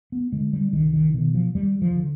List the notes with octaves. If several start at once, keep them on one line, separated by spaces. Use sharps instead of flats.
B3
D3 G#3
G3
C2 D#3
D#3
B2 D#3
F3
D#2 G3
F3
D3